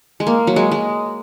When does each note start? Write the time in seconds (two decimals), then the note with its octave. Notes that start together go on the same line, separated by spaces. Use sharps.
0.20 G#3
0.27 A#3
0.47 F#3
0.56 G#3
0.72 G#3